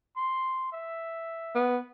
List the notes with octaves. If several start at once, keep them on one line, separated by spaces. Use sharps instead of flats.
C6
E5
B3